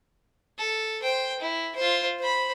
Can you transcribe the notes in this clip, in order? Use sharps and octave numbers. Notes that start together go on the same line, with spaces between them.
A4
C5 G5
E4
F4 C5
C5 B5